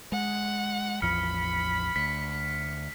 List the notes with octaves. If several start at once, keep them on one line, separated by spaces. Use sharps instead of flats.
G#3 F#5
A1 E2 F3 B5 F6 C#7
D2 B6